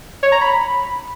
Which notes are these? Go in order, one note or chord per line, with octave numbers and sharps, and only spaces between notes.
C#5
A#5
B5